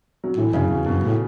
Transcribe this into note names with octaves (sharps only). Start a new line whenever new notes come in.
F#3
A2 E3
F#2 C#3
E2 B2
F#2 B2
A2